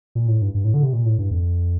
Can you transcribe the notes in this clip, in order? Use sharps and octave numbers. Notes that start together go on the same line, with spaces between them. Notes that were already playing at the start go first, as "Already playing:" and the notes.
A#2
A2
G2
G2
A2
D3
C3
A#2
A2
G2
F2